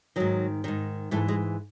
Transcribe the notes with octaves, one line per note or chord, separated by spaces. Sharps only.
G#2 D#3 F#3
G#2 D#3
G#2 E3 A3
G#3